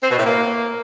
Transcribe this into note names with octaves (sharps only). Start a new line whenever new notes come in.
C4
B2
A2
A#3